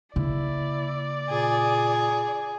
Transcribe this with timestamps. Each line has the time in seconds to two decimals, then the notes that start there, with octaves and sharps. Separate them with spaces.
0.16 C#3 A#3 E4 D5
1.29 A#2 G#4